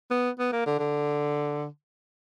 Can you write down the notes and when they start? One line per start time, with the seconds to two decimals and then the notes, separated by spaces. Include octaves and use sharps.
0.11 B3
0.39 B3
0.52 A#3
0.66 D3
0.79 D3